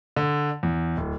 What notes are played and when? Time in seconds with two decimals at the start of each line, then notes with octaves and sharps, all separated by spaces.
0.16 D3
0.63 E2
0.97 D1